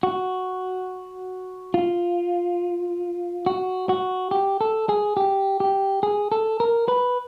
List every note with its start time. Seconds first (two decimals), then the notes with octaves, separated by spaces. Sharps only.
0.03 F#4
1.74 F4
3.46 F#4
3.89 F#4
4.31 G4
4.61 A4
4.89 G#4
5.17 G4
5.60 G4
6.03 G#4
6.32 A4
6.60 A#4
6.88 B4